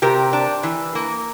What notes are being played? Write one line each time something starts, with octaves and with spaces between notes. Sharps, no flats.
C3 G4 A#4
D4
E3
A#3